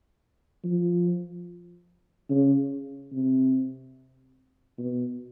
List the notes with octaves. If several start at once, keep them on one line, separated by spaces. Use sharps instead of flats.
F3
C#3
C3
B2